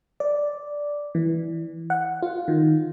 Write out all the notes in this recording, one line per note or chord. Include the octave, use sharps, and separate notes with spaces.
D5
E3
F#5
F4
D#3